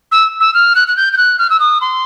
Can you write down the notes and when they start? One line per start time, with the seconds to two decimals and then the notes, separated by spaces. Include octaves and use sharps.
0.12 E6
0.40 E6
0.54 F6
0.75 F#6
0.88 F#6
0.96 G6
1.13 G6
1.17 F#6
1.39 F6
1.50 E6
1.60 D#6
1.81 C6